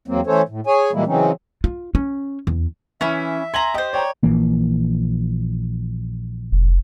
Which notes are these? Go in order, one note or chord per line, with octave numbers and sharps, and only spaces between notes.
E2 F#3 A#3 C4
E3 A3 C#4 A4 C5 C#5
A2
G#4 C#5 G#5
A#2 E3 G3 G#3 A#3 E4
C#3 E3 F#3 C4 C#4 D#4
F4
C#4
E2
E3 C#4 E4 E5 B5
G#5 A#5 C6 F#7
G4 C5 D#5
C#5 D5 G5 A#5
A#1 E3 A#3
F1